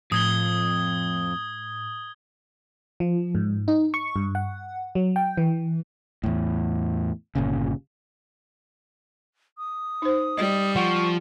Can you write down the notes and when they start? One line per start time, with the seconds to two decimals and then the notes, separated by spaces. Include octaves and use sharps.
0.12 F2 A2 D#6 G#6 G7
3.00 F3
3.35 G#2
3.68 D#4
3.94 C#6
4.16 G2
4.35 F#5
4.95 F#3
5.16 G5
5.37 E3
6.24 E2 A2
7.35 G1 A#2 C#3
9.58 D#6
10.02 D#4 C5
10.38 G3 D#5
10.76 F3 F#5 C#6